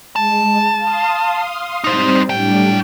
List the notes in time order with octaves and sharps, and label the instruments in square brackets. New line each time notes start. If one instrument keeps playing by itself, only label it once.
[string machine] G#3 [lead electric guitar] A5
[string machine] F5 C6 D#6
[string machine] G3 C4 [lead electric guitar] D#4 C5
[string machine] A2 G3 D4 [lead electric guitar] F#3 G5